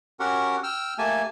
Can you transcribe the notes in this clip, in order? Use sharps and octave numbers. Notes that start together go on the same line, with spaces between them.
C#4 F#4 G4 A#4 F#5
G5 E6 F6
A3 A#3 G4 G#5 A5